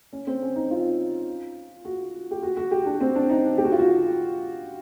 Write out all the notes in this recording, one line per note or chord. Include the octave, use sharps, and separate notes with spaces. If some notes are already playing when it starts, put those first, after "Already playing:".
C#4
C4
C#4
D#4
F4
F#4
G4
F#4
F#4
G4
D4
C4
D4
D#4
G4
F#4
F4
F#4